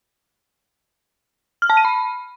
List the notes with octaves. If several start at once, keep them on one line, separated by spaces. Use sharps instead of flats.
F6
A5
D#7
B5